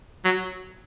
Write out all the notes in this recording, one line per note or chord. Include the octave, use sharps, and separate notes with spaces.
F#3